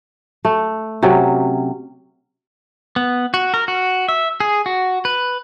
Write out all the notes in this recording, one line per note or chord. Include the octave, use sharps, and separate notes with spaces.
A3
C3 F#3 C#4
B3
F#4
A#4
F#4
E5
G#4
F#4
B4